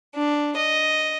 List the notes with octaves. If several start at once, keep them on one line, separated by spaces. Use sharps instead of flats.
D4
D#5